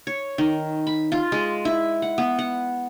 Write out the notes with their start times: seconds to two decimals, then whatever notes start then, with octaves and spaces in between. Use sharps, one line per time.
0.07 C#5
0.38 D#3
0.87 B5
1.12 F4
1.32 G#3
1.65 E4
2.02 F#5
2.18 B3
2.39 F#5